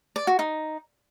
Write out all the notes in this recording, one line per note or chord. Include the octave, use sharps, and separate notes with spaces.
D5
F#4
D#4